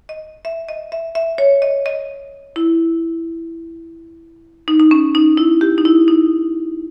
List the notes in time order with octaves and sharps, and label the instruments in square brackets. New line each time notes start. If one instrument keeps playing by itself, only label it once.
[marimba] D#5
E5
D#5
E5
E5
C#5
D#5
D#5
E4
D#4
D#4
C#4
D#4
E4
G4
D#4
E4
D#4